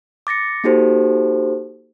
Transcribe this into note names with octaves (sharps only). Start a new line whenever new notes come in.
D6 A6 A#6 C#7
A#3 D#4 F#4 G4 A4 C5